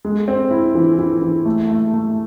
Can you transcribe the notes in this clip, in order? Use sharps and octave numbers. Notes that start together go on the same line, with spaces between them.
G#3
C4
E4
E3
E3
E3
A3
A3
A3